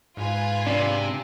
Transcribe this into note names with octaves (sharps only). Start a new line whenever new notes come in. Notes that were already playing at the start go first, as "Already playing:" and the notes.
G#2 F4 B4 G#5
C3 D4